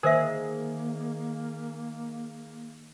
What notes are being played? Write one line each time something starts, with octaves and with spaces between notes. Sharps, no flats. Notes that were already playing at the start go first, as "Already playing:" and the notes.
D#3 A#3 G#4 A#4 C5 E5